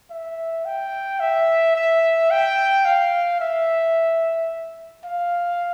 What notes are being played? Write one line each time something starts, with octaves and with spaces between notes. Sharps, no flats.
E5
G5
E5
E5
G5
F5
E5
F5